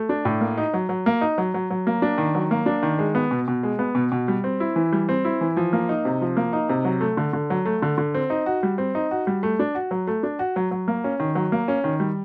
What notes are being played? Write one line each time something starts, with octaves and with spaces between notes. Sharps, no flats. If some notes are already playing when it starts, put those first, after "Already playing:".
Already playing: A3
D4
A2
A#3
D#4
F#3
F#3
A#3
D#4
F#3
F#3
F#3
A#3
D4
D#3
F#3
A#3
D4
D#3
G#3
B3
B2
B2
G#3
B3
B2
B2
G3
C4
E4
E3
G3
C4
E4
E3
F3
A#3
D#4
C3
F3
A#3
D#4
C3
F#3
A3
D3
D3
F#3
A3
D3
D3
C4
D#4
F#4
G3
C4
D#4
F#4
G3
A3
D4
F#4
F#3
A3
D4
F#4
F#3
F#3
A#3
C#4
D#3
F#3
A#3
C#4
D#3
G3